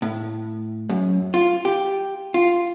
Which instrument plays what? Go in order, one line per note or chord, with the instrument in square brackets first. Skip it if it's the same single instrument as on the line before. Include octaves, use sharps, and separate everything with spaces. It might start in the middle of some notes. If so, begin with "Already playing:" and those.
[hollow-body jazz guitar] A2
F#2
F4
G4
F4